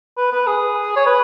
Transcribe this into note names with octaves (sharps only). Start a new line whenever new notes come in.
B4
B4
G#4
C#5
B4